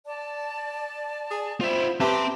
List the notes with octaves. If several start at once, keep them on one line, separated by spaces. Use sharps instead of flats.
D5 A5
G#4
C4 F4 C5 E5 B5
C4 G4 B4 E5 A5 A#5 C6 D6